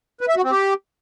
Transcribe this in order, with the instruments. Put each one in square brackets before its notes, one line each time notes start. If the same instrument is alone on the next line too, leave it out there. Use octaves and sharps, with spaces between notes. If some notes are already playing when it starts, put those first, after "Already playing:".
[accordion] B4
E5
F#4
C4
G4